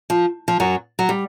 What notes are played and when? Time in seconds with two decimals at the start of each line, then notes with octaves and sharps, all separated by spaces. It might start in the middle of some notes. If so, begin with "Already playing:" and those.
0.10 F3
0.48 F3
0.60 F#2 F#3
0.99 F#3
1.09 G3